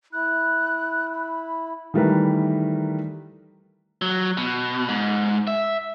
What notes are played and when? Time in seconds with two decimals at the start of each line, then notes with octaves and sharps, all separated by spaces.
0.13 E4 F#6
1.13 B5
1.94 D#3 E3 G3 A3 A#4 B4
4.02 F#3
4.38 B2
4.89 G#2
5.47 E5